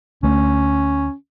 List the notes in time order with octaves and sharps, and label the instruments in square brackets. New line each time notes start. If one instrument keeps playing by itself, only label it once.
[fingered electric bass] D2 A3 [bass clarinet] C#4